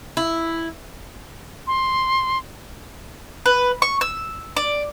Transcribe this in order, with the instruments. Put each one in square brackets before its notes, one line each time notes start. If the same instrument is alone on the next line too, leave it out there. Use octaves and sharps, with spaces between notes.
[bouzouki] E4
[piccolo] C6
[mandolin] B4
C#6
E6
D5